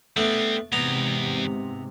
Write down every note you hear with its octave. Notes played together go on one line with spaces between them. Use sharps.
G3 A3 B3 C4 D4
E2 G#2 C3 B3 A#5